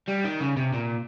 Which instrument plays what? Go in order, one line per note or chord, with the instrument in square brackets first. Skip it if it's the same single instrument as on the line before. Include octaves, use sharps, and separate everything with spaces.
[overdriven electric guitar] G3
D#3
C#3
C3
A#2